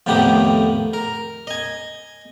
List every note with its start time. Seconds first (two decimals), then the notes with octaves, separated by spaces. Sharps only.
0.07 F2 A2 D#3 B3 G4 D#6
0.93 A#4
1.47 D#5 G#5